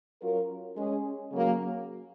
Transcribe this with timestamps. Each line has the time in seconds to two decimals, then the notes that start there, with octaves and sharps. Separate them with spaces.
0.21 F#3 C#4 F4 A#4
0.76 G#3 C#4 G#4
1.32 C#3 F#3 A#3